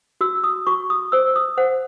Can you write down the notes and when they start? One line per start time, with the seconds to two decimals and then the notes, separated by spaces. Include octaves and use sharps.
0.21 F#4 E6
0.44 D#6
0.67 F#4 C#6
0.90 D#6
1.12 C5 E6
1.36 D#6
1.57 C5 F#5